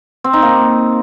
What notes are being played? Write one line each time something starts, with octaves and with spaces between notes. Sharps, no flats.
C4
D#4
A#3